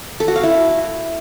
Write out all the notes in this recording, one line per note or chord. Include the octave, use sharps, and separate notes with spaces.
A4
F#4
F5
E4